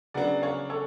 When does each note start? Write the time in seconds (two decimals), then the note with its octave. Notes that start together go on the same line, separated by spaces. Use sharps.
0.14 C#3 F#3 B3 D4 D5 F#5
0.42 C#5 F5
0.70 A4 C#5